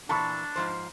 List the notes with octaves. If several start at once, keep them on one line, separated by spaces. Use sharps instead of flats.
A#2 E3 D4 A5 B5 C#6
G#2 F3 C5